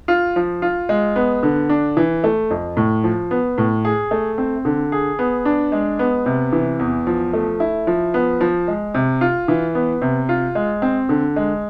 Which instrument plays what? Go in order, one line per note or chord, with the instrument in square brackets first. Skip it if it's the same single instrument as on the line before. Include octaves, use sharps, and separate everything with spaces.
[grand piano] F4
F3
F4
G#3
B3
D3
D4
E3
A3
F2
A2
F3
B3
A2
G#4
A3
C4
D3
G#4
B3
D4
G#3
B3
C3
E3
E2
F3
A3
E4
F3
B3
F3
G#3
C3
F4
E3
B3
C3
F4
G#3
C4
D3
G#3